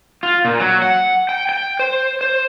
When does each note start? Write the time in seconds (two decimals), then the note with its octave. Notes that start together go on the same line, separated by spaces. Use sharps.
0.23 F4
0.45 A#2
0.59 F#3
0.82 F#5
1.29 G5
1.49 G5
1.79 C5
2.21 C5